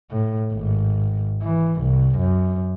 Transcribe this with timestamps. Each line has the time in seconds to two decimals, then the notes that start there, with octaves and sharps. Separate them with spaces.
0.11 A2
0.53 G#1
1.43 E3
1.82 C2
2.18 F#2